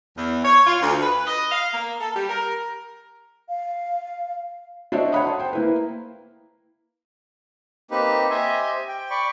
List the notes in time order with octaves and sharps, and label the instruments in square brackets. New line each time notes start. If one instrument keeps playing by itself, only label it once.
[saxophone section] E2
C#5
F4
D2
B4
D#5
F5
A#3
A4
G3
A#4
[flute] F5
[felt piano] D4 F#4 C5 C#5 D#5 E5
C#5 F#5 B5 D#6
A5 C6
C5 G5
A#3 E4 B4
[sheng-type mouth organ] A#3 C4 D#4 G4 B4
G4 C5 D#5 E5 G#5
G5
D5 G5 B5 C#6